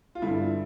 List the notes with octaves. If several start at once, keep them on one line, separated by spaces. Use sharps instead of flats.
F4
G2 D3 E4